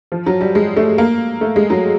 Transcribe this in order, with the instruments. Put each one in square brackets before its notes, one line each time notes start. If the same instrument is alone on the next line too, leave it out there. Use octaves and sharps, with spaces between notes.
[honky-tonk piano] F3
F#3
G3
G#3
A3
A#3
A3
G#3
F#3